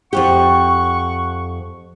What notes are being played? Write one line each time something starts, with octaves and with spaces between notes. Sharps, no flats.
F2 G#2 G4 F#5 C#6